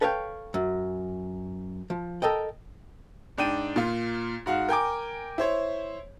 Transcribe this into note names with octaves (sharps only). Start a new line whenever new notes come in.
A4 B4 C#5 F5 G5
F#2
F3
A4 A#4 D#5 G5
G#2 D4 G5 D#7
A#2 F4
G#2 F#4 F5
A#4 G5 G#5 D6
E4 C5 C#5